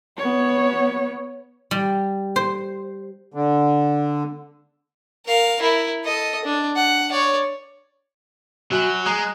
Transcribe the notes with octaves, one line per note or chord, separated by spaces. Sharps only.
B3 C#5
G3
C5
D3
A#4 F5
E4 A#4
A4 D#5
D4
F#5
C#5 D5
F#3 F#4 G#5 F#7
G#3 A#5 D#6 F#6